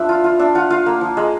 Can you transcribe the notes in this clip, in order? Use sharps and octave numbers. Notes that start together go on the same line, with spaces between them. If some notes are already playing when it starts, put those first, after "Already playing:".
Already playing: F3 D4 B4 E5
F4
F4
D4 E5
F4 F#5
F4 F5
A#3
F3
G#3